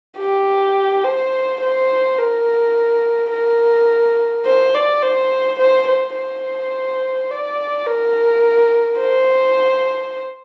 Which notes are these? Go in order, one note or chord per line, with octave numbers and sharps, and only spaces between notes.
G4
C5
C5
A#4
A#4
C5
D5
C5
C5
C5
C5
D5
A#4
C5